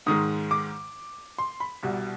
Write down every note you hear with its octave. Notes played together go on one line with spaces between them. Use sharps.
G#2 D#3 G#3 D#6
D6
C6
B5
C2 B2 G3